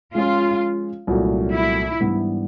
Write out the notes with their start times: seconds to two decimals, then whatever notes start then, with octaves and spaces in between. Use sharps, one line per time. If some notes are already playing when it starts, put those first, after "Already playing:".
0.14 F3 G#3 C#4 F4
1.07 C2 A#2 F#3 A3
1.53 E4
2.00 G#2 E3 G3 B3 D4